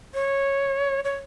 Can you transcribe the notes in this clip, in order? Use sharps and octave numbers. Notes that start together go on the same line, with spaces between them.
C#5
C#5